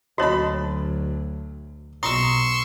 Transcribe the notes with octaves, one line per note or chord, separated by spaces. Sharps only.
D2 F#3 F#4 C#5 D#5 A5 B5
B1 A#5 C6 C#6 D#6 E6